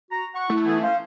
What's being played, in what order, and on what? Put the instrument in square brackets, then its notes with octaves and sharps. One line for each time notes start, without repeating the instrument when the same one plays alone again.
[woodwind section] F#4 A#5
F#5 C#6
[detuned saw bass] A3 [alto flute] E4
[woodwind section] E3 B3 G#4
[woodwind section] C#4 C5 [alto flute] F5